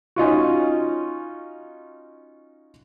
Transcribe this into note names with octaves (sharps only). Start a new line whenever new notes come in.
C#4 D#4 F4 F#4